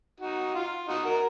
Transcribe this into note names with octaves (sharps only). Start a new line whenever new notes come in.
D#4 F#4
F4
D#4 F#4
F#4 A#4